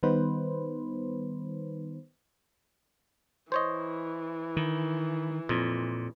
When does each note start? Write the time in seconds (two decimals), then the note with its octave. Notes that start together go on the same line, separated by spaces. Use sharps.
0.03 D#3 G3 B3 D#4 B4 C5
3.52 E3 C5 C#5 D#5
4.57 D#3
5.49 F2 A#2